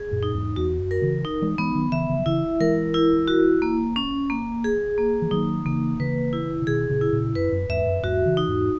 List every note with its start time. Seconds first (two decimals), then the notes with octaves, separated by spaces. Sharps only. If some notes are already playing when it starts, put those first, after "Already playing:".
Already playing: G#4
0.11 F#2 A#2
0.23 D#4
0.34 E2 G#2
0.56 E2 F#4
0.79 F#2
0.91 A#4
1.02 C#3 E3
1.25 D#4
1.42 E3 G#3
1.58 E3 G#3 B3
1.75 D#3 F#3
1.92 C#3 E3 E5
2.09 C#3 E3
2.18 F#3
2.26 C#3 E3 E4
2.60 E3 G#3 A#4
2.94 E4
3.27 F#4
3.62 A#3
3.96 C#4
4.30 A#3
4.64 G#4
4.98 A#3
5.22 E3
5.31 D#3 F#3 D#4
5.65 C#3 E3 A#3
5.99 C#3 E3 B4
6.33 E4
6.62 C#3
6.67 B2 D#3 G#4
6.89 A#2 C#3
7.01 E4
7.13 A#2 C#3
7.35 F#2 B4
7.52 F#2
7.69 E2 G#2 E5
7.86 F#2
8.03 E2 G#2 F#4
8.26 C#3 E3
8.37 D#4
8.48 E2 G#2